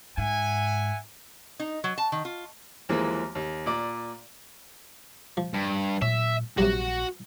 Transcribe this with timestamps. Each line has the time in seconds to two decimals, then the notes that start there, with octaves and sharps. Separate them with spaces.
0.17 G#2 E5 F#5 G#5
1.60 D#4
1.84 F#3
1.98 A5
2.12 D#3
2.25 F4
2.89 D#2 E3 F3 G#3 A#3
3.35 D#2
3.66 A#2 D5
5.37 F3
5.54 G2
6.02 A#2 F#3 C#4 E5
6.58 A#1 C3 F#3 G3 F#4